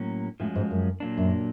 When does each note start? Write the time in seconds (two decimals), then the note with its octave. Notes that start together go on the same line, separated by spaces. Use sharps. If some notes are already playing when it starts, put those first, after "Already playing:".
Already playing: A2 F#3 A#3 C#4
0.40 A2 F3 G#3 C#4 F#4
0.55 G#2
0.71 F#2
1.00 A#2 F#3 A#3 D4
1.17 F#2